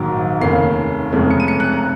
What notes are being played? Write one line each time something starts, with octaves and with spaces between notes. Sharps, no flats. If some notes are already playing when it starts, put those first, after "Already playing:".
Already playing: A#1 G#2 D#3 F#3
F1 D#2 C#3 C7
F1 F2 C#3 G#3
C#7
D#7
C#7
F#6
A#5